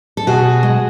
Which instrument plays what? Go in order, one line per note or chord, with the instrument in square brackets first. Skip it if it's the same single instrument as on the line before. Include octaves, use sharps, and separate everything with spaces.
[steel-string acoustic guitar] A4
B2 F#4 G#4
G#3